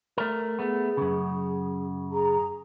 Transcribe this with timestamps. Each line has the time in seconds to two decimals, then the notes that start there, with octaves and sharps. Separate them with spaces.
0.18 A3 A#4
0.59 A3 B3 G#4
0.97 F#2 C#3
2.11 G#4 A#5